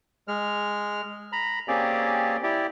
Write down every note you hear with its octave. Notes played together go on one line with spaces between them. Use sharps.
G#3 F6
A#5 B5
A#3 C4 C#4 G4 G#4 D5
E4 G4 D5